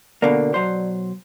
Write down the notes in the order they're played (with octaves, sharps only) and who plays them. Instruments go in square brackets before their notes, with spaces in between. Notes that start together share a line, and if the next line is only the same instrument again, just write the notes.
[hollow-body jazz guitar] B2 D3 A#3 [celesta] D5
[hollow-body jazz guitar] B1 F#3 C5